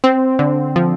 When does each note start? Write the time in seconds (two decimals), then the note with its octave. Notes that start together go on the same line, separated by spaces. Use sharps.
0.04 C4
0.39 D3
0.76 F3